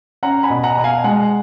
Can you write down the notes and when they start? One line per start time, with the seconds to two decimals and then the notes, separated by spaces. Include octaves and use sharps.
0.23 C#4 F#5 A#5
0.43 G#5 B5
0.50 B2
0.63 F#5 A#5
0.78 B2 A#5
0.84 F5 G#5
1.04 G#3 F#5